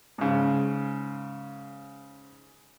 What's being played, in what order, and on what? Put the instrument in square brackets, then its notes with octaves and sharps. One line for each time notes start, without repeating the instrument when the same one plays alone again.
[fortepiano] G#2 C#3